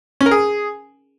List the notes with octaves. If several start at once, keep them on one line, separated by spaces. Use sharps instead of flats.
C#4
A#4
G#4